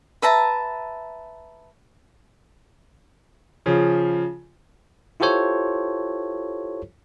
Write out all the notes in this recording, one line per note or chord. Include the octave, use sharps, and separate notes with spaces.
B4 E5 A5 A#5
C#3 F3
E4 F4 G4 A4 C5 C#5